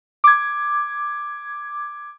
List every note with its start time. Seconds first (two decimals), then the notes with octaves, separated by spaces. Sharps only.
0.24 D6 G#6